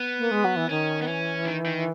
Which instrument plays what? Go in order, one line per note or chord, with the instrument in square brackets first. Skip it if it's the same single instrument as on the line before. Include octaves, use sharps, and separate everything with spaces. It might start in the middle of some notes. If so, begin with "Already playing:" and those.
Already playing: [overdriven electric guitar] B3
[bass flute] A#3
G#3
F#3
E3
[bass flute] D#3 [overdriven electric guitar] C#4
[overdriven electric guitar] B3
[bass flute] E3 [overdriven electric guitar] C#4
[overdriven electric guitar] D#3
D#3